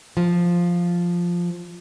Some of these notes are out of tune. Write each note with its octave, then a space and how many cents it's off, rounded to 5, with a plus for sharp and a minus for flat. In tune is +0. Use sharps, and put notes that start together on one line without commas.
F3 +0